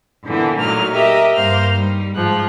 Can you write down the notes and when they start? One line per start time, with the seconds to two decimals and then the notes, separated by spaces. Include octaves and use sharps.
0.24 A#2 D3 E3 B3
0.60 A#2 F#3 A3 D#4 F6
0.93 G4 A#4 D#5 E5
1.35 G2 A#3 C5 F5 F6
1.73 G3 D#4
2.14 G#2 F3 F#6